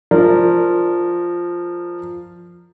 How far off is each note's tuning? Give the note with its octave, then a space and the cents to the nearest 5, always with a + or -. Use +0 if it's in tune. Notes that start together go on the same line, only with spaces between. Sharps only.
F3 +0 A#4 -15 D5 +0